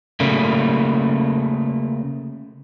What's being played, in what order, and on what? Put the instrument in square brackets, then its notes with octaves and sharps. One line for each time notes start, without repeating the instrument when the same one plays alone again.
[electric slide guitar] C#3 A3 A#3